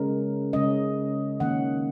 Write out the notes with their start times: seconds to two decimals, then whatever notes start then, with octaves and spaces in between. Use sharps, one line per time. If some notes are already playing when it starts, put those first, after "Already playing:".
Already playing: C#3 G#3 C#4 A#4
0.53 C#3 G#3 C#4 D#5
1.40 D#3 A#3 C#4 F#5